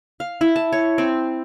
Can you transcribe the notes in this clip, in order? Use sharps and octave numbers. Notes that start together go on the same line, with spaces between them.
F5
E4
A5
C#5
C4